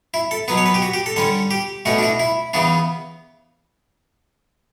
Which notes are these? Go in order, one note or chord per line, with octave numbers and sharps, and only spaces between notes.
E4
A4
B2 F#3 B3 B4
C#5
B4
G4
F#4
G4
A4
D3 G3 C#4 A4
G4
B2 A3 C#4 F#4
D4
E4
E4
C#3 E3 B3 D4